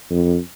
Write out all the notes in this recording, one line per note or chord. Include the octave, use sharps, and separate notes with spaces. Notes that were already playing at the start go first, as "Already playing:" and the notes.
F2